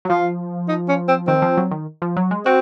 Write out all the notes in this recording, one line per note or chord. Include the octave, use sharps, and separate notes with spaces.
F#3
F3 F4
D#4
C#4
C4
D#3 C4
F3
F#3
D#3
F3
F#3
G#3
C4 F#4